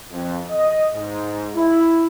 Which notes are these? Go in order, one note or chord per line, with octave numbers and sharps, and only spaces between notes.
F2
D#5
G#2
E4